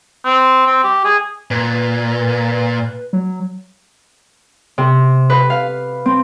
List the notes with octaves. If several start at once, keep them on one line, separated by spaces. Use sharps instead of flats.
C4
C4
G4
G#4
A#2 B4
F#3
C3
B4
F5
C4